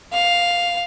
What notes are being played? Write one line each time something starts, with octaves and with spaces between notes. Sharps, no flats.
F5